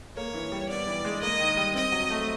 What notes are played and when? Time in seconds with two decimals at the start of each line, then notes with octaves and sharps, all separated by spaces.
0.17 A#3 C#5
0.34 E3
0.52 G3
0.69 B3 D5
0.87 E3
1.05 G#3
1.22 A#3 D#5
1.39 D#3
1.57 G3
1.75 C4 D#5
1.92 F#3
2.10 A3